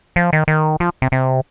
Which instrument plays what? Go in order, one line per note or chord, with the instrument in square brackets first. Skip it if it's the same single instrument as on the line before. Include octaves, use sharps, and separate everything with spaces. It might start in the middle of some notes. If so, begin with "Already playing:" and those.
[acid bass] F3
D#3
D#3
F3
C3
C3